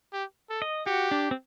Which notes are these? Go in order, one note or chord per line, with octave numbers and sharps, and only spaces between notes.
G4
A4
D#5
F#4 G4
D4
C4